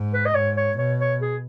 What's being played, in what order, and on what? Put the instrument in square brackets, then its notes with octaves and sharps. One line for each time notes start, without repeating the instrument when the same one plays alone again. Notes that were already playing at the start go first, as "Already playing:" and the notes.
Already playing: [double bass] G#2
[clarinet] B4
D#5
[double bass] G#2 [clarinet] C#5
[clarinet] C#5
[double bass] B2 [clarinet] C#5
[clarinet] C#5
G#4